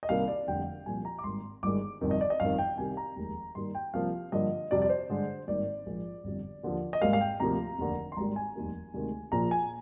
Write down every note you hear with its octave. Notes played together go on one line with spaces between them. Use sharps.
D#5
C2 C3 D#3 A#3 F5
D5
F1 F2 D3 G3 G5
C2 A#2 F3 G#5
A#5
D6
G#1 G2 D#3 C6
G1 G2 D#3 G#3 D6
G1 F2 C3 D#3
D#5
D5
D#5
G1 F2 D#3 F5
G5
C2 C3 D#3 G#5
A#5
F1 D#2 D#3 G#3
G2 D#3 G3 A#3 C6
G5
C2 C3 F3 A#3 F5
G2 D3 F3 A#3 D#5
F2 C3 G3 D5
D5
C5
G2 D3 G#3
G#1 G2 D#3 G3 A#3 D5
A#1 G#2 F3 A#3
G1 F2 D3 G3
D#2 D3 F3
D#5
G#1 G#2 G3 A#3 F5
F5
G5
D2 C3 F3 A#3 A#5
F1 D#2 D3
C6
G#1 G#2 D#3 G3 A#3 A#5
G#5
F1 D#2 D#3 G3 A#3
D2 C3 D#3 G#3
A#1 A#2 F3 A#5
G#5